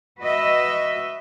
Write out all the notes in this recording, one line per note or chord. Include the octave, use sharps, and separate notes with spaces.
F#4 B4 D#5 E5